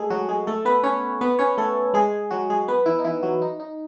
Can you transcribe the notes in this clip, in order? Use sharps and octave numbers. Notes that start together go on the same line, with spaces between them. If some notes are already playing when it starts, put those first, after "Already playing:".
Already playing: G#3 A3 G#4 A4
F#3 F#4
G#3 G#4
A3 A4
B3 B4
C#4 C#5
B3 B4
C#4 C#5
A3 A4
G#3 G#4
F#3 F#4
G#3 G#4
B3 B4
E3 E4
D#4
E3 E4
F#3 F#4
D#4
D#4